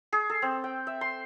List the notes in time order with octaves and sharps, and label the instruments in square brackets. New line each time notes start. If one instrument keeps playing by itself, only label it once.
[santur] G#4
A4
C4
G5
E5
C6